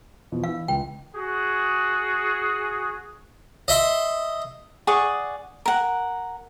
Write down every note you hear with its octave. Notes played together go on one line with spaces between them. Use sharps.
E2 B2 F3
E3 F5 E6
C#2 G5
F#4 G#4
D#5 E5 C6
G#4 D5 F#5 C#6
A#4 F#5